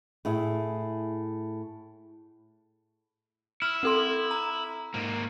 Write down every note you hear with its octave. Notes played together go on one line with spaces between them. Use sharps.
A2 G#4 E5
E4 F6
C4 A4 C6
A#5
G#2 A#3